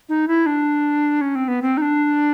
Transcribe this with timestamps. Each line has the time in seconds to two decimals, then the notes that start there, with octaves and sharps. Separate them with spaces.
0.09 D#4
0.28 E4
0.46 D4
1.21 C#4
1.35 C4
1.48 B3
1.62 C4
1.77 D#4
1.82 D4